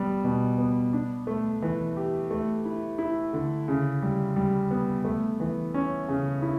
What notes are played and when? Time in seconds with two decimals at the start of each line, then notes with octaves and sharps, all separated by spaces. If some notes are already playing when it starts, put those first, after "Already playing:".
Already playing: G3 B3
0.24 B2
0.58 B3
0.93 D4
1.27 A3
1.62 E3
1.97 G4
2.30 A3
2.65 E4
2.99 E4
3.33 D3
3.68 C#3
4.02 G3
4.36 G3
4.71 B3
5.05 A3
5.40 E3
5.74 C#4
6.08 C#3
6.42 E4